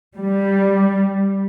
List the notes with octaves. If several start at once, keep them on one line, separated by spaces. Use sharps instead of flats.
G3